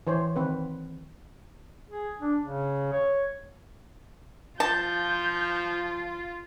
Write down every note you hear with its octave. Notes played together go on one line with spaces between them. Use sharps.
E3 C5 C#5
D#3 C4 B4
G#4
D4
C#3
C#5
F3 F4 A5 G6